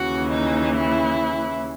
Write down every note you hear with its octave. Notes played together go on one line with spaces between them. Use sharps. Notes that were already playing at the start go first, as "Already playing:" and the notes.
Already playing: D#2 C#3 E3 F#4
D#4
E4